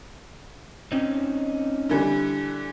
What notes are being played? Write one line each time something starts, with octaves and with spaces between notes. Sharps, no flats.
C4 C#4 D#4
D3 E3 G3